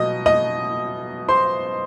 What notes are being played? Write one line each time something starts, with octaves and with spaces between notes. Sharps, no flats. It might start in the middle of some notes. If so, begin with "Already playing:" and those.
Already playing: B2 F#3 D#5 D#6
D#5 D#6
C5 C6